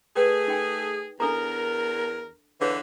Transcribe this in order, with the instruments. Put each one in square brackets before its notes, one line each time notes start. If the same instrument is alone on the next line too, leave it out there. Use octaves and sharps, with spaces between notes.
[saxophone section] A3 G#4 [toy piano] B4 G5
[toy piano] D#4 G5 G#5
[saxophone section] E2 A#4 [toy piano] D4 A4 A#5
[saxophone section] D3 E3 B4 [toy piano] G#4 C#5 F5